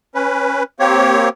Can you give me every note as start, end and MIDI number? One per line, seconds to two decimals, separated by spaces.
0.15 0.63 61
0.15 0.63 71
0.80 1.29 58
0.80 1.29 60
0.80 1.29 67
0.80 1.29 73